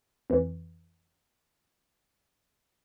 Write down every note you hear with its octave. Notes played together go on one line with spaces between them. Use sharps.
F2 E3